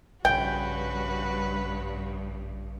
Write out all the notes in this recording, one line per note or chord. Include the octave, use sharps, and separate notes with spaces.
A#1 G2 C#3 F#4 B4 G5